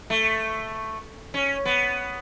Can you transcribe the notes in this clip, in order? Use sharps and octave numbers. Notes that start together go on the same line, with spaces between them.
A3
C#4
B3